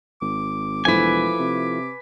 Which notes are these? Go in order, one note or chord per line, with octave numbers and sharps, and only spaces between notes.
G#1 D6
E1 F3 A3 E4 B4 G#5
C3